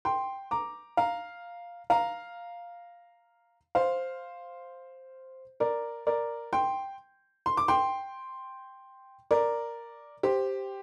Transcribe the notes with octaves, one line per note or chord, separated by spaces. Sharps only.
G5 C6
A#5 D6
F5 A#5
F5 A#5
C5 F5
A#4 D5
A#4 D5
G5 C6
C6
D6
G5 C6
A#4 D5
G4 C5